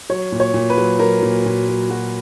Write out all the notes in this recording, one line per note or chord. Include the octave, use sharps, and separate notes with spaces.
F#3 C#5
A#2
C#5
A#2
B4
F#3
F#3 A#4
A#2
A#2
F#3
F#3 F#4